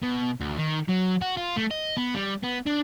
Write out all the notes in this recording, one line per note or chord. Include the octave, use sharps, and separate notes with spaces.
B2
D2
D#3
F#3
F#4
F4
A3
D#5
B3
G3
B3
D4